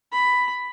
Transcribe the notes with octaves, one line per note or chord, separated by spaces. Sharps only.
B5